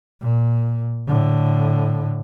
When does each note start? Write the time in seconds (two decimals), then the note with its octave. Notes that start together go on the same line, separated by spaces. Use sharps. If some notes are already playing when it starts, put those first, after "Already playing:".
0.21 A#2
1.07 A2 D3